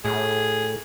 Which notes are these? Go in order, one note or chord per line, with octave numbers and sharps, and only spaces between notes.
A2 G#4